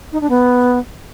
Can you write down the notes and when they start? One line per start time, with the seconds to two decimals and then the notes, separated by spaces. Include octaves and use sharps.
0.12 D#4
0.21 D4
0.30 B3